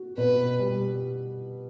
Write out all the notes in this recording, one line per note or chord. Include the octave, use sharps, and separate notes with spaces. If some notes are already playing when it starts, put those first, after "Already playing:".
Already playing: F#4
B2 B4
G3